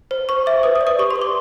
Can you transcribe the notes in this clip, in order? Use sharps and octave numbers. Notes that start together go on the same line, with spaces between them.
C5
C5 C#6
E5 D6
B4 D#6
D#6
D5
D#6
G4 C#6
C6
B4
D6